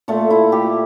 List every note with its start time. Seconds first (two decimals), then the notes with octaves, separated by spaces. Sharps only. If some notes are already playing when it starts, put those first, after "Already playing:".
0.08 A#2 A3 F4
0.30 E4
0.52 G4